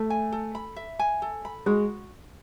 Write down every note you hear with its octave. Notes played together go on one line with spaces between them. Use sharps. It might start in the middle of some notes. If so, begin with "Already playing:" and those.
Already playing: A3 E5
G#5
A4
B5
E5
G#5
A4
B5
G#3 F#4